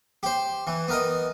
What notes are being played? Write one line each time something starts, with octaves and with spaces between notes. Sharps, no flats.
G4 C5
E3
B3 A#4 D#5